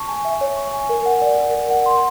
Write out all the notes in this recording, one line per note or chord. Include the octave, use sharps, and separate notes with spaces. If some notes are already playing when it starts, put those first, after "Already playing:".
Already playing: A5 C#6
G#5
E5
C#5
C#6
G#5
A#4
F#5
D5
A#4
A#4
F#5
C6